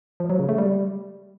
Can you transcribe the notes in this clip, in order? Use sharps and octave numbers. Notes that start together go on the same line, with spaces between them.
F3
F#3
C#3
A3
G3